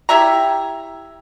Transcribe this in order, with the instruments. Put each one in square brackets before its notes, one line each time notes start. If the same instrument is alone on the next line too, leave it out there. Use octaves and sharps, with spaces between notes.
[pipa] E4 G4 E5 A#5